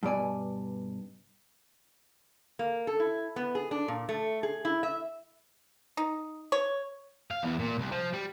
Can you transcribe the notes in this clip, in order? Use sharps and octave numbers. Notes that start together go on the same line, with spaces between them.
G2 B2 D5 G#5
A#3
A4
E4
B3
G#4
D4
A#2
A3
G#4
E4
E5
D#4
C#5
F5
E2
A#2
C2
F3
G3